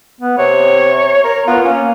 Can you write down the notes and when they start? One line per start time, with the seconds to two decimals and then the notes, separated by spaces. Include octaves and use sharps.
0.21 B3
0.38 C3 C#5
1.24 A#4
1.47 B3 F4
1.65 A#3 C#4